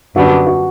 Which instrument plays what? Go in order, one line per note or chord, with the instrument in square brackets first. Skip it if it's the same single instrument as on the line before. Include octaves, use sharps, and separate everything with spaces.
[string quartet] F#2 D3 G3 B3 D4 [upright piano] F#4
[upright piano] F#4